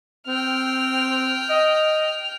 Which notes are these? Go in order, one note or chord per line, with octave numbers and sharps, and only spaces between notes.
C4 G5 F6
D#5